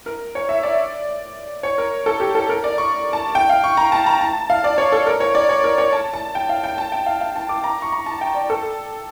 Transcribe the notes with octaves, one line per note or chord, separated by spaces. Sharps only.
A#4
C#5
E5
D5
C#5
A#4
A4
G4
A4
A#4
D5
C#6
A5
G5
F5
C#6
A#5
A5
A#5
A5
F5
D5
C#5
A4
A#4
C#5
D5
C#5
A#4
C#5
A5
A5
G5
F5
G5
A5
G5
F5
F5
A5
D6
A#5
C#6
A#5
A5
G5
D5
A4